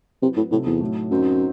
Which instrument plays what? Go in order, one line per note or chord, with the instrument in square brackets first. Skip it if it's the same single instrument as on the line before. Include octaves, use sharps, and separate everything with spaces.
[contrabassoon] C3 [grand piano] F#3 C4 E4 B4
[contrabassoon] A2
[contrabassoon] A2 [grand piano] C3 F#3 C4 D#4 A4
[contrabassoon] E2
[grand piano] A2 F#3 A3 D#4
[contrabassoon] F#2 [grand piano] F#3 C4 D#4